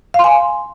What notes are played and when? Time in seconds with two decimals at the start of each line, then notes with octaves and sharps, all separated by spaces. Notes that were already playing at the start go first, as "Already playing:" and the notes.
0.14 F5
0.19 C6
0.24 G#5